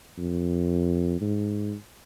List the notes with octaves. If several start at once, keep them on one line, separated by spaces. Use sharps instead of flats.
F2
G#2